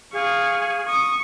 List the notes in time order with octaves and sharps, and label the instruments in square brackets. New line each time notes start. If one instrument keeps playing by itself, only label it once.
[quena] G#4 [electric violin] F5 C#6
[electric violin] C#6 [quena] D#6